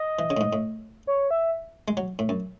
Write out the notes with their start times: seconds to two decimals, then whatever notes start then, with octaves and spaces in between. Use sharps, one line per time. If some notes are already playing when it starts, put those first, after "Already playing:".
Already playing: D#5
0.19 E3
0.30 C#3
0.37 A2
0.41 G#2
0.53 A2
1.07 C#5
1.31 E5
1.88 G#3
1.97 F#3
2.19 A2
2.29 F#2